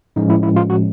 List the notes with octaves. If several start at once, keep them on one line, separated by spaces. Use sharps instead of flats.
A2 F3 G#3 C#4 D#4
E4
E4
F4
F#4